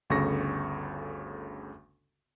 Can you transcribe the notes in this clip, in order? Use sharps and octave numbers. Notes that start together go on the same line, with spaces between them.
G1 D2 C#3 A4 C#6 A#6